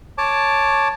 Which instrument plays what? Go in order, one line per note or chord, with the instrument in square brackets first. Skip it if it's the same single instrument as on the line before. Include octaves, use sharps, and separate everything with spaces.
[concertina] C#5 A5 D6